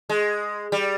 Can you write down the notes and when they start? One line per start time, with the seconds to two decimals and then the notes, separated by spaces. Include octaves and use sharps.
0.10 G#3
0.72 G3